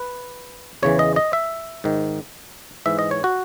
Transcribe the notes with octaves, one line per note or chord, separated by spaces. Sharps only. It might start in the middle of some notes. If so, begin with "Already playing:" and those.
Already playing: B4
E2 C#3 E3 C#5
D#5
D#5
E5
G#2 D#3
G#2 E3 E5
D#5
C#5
F#4